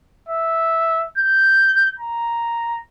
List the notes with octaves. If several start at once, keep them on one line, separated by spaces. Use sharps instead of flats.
E5
G6
A#5